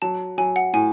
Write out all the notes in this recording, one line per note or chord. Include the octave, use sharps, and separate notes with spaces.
F#3 A5
F#3 G#5
F#5
A2 G#5